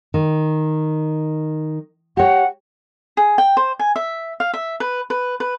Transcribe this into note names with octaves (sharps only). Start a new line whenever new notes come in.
D#3
G4 C#5 F#5
G#4
G5
C5
G#5
E5
F5
E5
B4
B4
B4